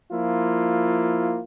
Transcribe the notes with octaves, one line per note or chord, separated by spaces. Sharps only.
F3 A#3 E4 F4